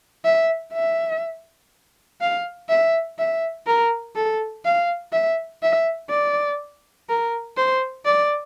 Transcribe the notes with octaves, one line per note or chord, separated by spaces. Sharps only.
E5
E5
F5
E5
E5
A#4
A4
F5
E5
E5
D5
A#4
C5
D5